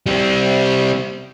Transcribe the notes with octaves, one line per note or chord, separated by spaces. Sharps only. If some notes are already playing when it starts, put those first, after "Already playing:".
G3 C4